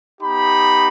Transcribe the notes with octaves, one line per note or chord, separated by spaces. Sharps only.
B3 D#4 G4 B5